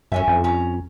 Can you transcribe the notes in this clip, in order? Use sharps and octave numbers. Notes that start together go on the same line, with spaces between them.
F#2 E3 C#4 E5
F2
C#4 A#5